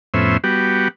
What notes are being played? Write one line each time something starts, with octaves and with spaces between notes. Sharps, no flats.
F2 A2 B3 C#4 C5 E5
G3 B3 F#4 G4